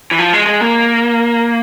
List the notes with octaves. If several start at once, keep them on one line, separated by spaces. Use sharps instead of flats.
E3
F3
G#3
G#3
A#3